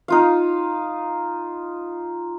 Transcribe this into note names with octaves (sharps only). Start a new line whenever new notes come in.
D#4 F4 F5